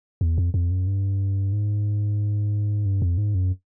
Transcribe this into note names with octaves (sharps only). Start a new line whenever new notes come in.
E2
F2
F2
F#2
G2
G#2
G2
F2
G#2
F#2